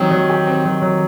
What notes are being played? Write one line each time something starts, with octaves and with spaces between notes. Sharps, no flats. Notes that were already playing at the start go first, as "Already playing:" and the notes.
Already playing: D#3 F#3 C4 G4
F#3
G4
C4
F#3
F#3